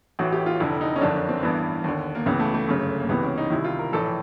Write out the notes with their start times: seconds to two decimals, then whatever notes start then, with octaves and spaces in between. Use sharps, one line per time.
0.19 A1 A2 E3 F#4
0.33 G4
0.46 F4
0.60 F1 F2 D3 E4
0.81 D#4
0.96 C#4
1.01 F#1 F2 D3 D4
1.15 C#4
1.29 C4
1.43 A1 G2 E3 B3
1.84 D#2 D3
2.15 A#3
2.26 C#2 C#3 E3 B3
2.39 A3
2.54 A3
2.68 G1 F#2 C#3
3.00 A#3
3.09 C#2 C3 E3 B3
3.23 C#4
3.38 D#4
3.50 C2 C3 D#3 E4
3.65 F4
3.79 A#4
3.92 A#1 A2 E3 A4